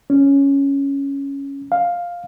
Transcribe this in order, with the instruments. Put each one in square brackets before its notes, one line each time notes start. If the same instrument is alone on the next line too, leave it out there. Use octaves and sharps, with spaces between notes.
[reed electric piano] C#4
F5